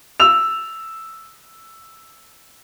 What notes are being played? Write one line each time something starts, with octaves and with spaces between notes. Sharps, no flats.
E6 F7